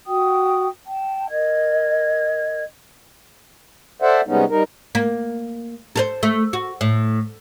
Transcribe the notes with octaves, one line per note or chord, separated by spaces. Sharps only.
F#4 G5 D#6
G5 A5
A#4 D#5 G#6
A4 C5 D5 E5 F#5
C3 G3 G#3 B3 C#4 D#4
G3 D#4 A#4
A#3
A4 A#4 C5
A3
F#4
A2